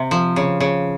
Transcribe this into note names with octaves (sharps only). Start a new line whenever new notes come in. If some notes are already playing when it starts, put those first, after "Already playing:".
Already playing: C3
F3
C#3
C#3